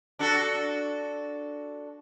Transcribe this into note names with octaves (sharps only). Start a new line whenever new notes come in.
D4 F#4 A4